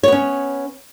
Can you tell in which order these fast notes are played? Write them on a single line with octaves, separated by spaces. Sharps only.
C#5 B3 C#4